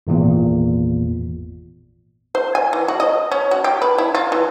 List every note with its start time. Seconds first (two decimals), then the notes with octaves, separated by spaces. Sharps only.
0.07 G#1 E2 A#2
2.35 C5
2.55 G#5
2.73 E3
2.88 F#4
3.00 D#5
3.32 C#4
3.51 F#4
3.64 G4
3.82 B4
3.98 E4
4.15 F4
4.32 E3